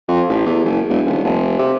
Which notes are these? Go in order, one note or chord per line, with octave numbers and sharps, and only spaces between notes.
F2
A1
E2
F#1
E1
D#1
F1
C3